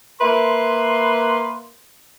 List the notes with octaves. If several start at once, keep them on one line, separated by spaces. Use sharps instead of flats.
A#3 B4 E5 C6